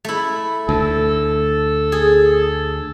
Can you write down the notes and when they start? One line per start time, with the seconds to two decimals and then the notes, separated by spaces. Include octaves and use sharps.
0.05 A3 E4
0.69 D2 A4
1.92 G#4